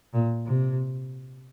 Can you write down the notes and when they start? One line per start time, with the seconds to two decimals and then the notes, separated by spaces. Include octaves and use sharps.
0.13 A#2
0.46 C3